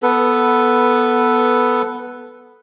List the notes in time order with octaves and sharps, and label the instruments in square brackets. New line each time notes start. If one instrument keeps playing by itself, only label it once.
[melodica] B3 A4 B4